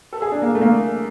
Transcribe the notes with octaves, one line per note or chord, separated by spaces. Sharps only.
A4
G#4
D4
A#3
A3
A#3